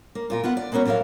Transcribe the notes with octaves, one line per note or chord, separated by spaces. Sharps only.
A#3
A#2 F4 A#4
B3 F4 F#5
D5
G#3 A#3 B3 C#4 F#4
A2 F#3 A#3 A4 F5